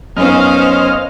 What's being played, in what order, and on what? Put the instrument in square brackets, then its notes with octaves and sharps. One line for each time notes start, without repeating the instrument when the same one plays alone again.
[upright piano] F#2 B3 D#4 [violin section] C#4 C5 F5 [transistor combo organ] D#5 F6